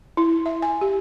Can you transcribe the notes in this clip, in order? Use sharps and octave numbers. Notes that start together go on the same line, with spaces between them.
E4
E5
G#5
G4